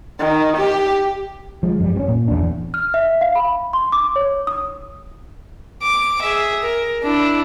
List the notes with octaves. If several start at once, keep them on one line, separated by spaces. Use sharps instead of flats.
D#3
G4
F3 G#3
F#2 G3
G2 C#4
A#2
E2 D4
F6
E5
F5
B5
C6
D6
C#5
D#6
D6
G#4 E5
A#4
D4 E4